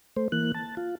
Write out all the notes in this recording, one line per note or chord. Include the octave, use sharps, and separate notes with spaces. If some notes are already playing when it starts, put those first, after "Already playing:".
A3 C5
E3 A#3 F#6
A5
F4